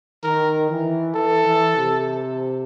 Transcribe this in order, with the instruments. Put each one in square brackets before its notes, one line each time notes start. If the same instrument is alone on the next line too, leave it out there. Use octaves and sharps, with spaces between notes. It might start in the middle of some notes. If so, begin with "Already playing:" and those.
[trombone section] D#3 [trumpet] A#4
[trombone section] E3
[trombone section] E3 [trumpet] A4
[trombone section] E3
C3